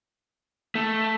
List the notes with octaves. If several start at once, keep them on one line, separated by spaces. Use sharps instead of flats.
A3